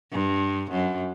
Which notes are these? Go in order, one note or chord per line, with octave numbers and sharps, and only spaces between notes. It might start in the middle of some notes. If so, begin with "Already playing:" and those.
G2
F#2